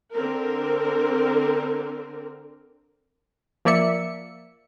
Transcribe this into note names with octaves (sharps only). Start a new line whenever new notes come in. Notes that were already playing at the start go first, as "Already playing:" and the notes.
D3 C4 A#4
F3 A#3 D5 E5 C#7